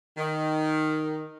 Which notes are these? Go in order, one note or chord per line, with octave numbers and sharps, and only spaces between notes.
D#3